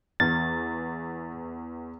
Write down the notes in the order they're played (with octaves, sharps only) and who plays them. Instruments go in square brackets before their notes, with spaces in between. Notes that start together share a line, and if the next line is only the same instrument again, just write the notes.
[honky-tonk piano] E2 [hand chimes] B3 [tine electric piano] A6